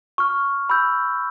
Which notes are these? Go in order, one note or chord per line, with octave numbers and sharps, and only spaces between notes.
C#6 F6
B5 E6 G6